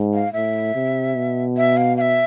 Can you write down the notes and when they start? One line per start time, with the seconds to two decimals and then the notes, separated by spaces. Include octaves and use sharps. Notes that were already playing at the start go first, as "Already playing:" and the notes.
Already playing: G#2
0.14 F5
0.33 A2 E5
0.75 C3
1.15 B2
1.57 E5
1.77 F5
1.97 F5
2.01 E5